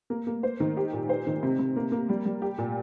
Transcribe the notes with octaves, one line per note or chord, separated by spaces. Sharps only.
A#3
A#3
C5
D#3
G4
A#2
C5
D#3
C3
C3
A#3
A#3
G3
G3
G4
A#2